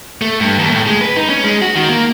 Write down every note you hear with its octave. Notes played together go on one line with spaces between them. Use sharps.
A3
G2
D#2
A2
G#3
B4
D#4
C#4
G#3
F#4
D#3
A#3